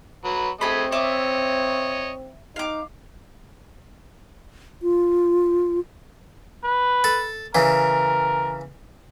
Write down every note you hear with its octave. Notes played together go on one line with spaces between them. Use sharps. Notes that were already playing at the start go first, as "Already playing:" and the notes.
F#3 B4
A3 C4 G#4 D#5 B5
C#5 D#5 E5 D6
D#4 F5 D6
F4
B4
A4
C#3 E3 A#4